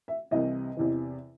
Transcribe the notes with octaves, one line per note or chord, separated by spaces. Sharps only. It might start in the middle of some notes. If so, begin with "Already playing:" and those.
E5
C2 C3 E3 D#5
E2 C3 E3